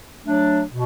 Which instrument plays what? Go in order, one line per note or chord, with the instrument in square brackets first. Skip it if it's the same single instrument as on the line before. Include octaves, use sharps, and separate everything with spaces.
[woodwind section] F#3 A3 D4
B2